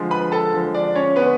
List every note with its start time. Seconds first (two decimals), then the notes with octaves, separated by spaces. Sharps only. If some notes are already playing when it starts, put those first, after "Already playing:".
Already playing: D3 F3 G#3
0.11 B4 B5
0.32 A4 A5
0.53 D3 F3 G#3
0.74 D4 D5
0.95 C#4 C#5
1.16 D3 G#3 B3 B4